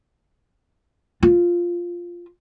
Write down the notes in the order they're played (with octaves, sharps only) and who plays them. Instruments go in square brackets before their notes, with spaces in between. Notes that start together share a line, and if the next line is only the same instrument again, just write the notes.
[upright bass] F4